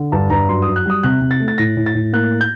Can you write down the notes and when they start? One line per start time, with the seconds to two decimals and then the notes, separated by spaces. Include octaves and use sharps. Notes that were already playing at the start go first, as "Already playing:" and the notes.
Already playing: D3
0.12 G2 A5
0.30 G2 A#5
0.48 F#2 C6
0.62 F#2 D#6
0.76 F#6
0.86 G3 D#6
1.03 C3 F#6
1.22 C3
1.31 A6
1.40 A3
1.48 A6
1.58 A2 A#6
1.77 A2
1.86 A6
1.95 A2
2.13 A#3 F#6
2.41 G6